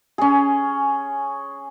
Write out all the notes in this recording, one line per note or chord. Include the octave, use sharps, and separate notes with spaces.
C#4 G#4